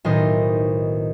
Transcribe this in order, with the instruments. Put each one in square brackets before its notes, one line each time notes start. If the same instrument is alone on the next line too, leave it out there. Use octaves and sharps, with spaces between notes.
[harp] B1 A2 D#3 C5 D#5